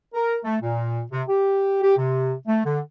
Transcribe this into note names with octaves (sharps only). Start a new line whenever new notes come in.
A#4
A3
A#2
C3
G4
G4
C3
A3
D3